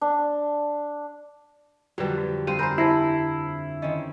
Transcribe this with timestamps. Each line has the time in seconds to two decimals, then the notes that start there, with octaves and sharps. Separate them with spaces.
0.01 D4
1.98 F2 D3 F#3 G3 G4 B4
2.18 F#4
2.47 G2 C4 C5 F5 D#7
2.59 A#4 C5 G#5 B5 G6
2.78 E4 A5 A#6 C7
3.82 D#3 C4 C#4 D#5